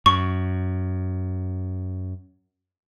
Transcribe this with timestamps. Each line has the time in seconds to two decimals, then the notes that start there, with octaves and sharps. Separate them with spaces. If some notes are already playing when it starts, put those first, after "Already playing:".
0.06 F#2 C#6